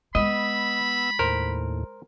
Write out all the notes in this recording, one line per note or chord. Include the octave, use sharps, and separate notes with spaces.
G#3 B3 D#5 B5 E6
D#2 A2 A#4 C5